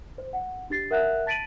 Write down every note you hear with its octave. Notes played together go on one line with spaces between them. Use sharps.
C5
F#5
D4 G4 A6 C7
A#4 E5 F#5 F#6
A5 A6 B6 D7 D#7 F#7